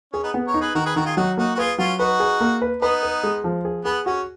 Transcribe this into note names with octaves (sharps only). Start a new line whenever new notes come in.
C#4 G#4
B3 D#4
B3
A#4 C#5
D#4
G#4 B4
D#3 F#4 A#4
G#4 B4
D#3 F#4 A#4
F4 G#4
F#3 D#4 F#4
A#3 D#4 F#4
F#4
F4 G#4 B4
F#3 C#4 F4
D#4 F#4 B4
G#4
A#3
B4
B3 D#4 B4
B4
G#3
F3
G#4
B3 G#4
C#4 F#4